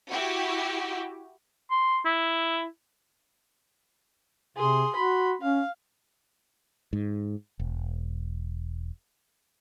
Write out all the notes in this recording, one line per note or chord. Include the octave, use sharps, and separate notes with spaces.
E4 F#4 G4
C6
E4
C3 G#4 C6
F#4 B5 C6
C#4 F5
G#2
E1